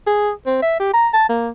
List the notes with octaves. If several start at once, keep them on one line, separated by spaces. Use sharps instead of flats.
G#4
C4
E5
G4
A#5
A5
A#3